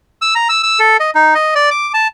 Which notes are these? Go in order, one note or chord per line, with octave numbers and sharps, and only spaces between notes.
E6
A#5
E6
E6
A4
D#5
D#4
D#5
D5
D6
A5